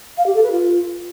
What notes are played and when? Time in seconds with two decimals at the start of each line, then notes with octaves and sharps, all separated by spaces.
0.18 F5
0.26 G4
0.35 A4
0.43 B4
0.52 F4